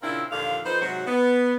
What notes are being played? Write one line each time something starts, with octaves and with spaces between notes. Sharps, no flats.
A#2 C#3 A#3 C4 D4 E4
D#2 A#2 D3 F3 F5
F2 D#4 B4 C5
G#2 C3 F#3 F#4
B3